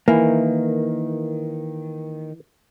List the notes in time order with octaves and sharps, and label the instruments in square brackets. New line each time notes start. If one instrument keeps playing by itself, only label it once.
[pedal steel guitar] D#3 [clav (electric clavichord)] E3 [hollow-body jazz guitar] A#3